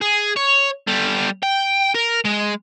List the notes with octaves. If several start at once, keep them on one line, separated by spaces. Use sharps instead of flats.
G#4
C#5
G3 A4
G5
A#4
G#3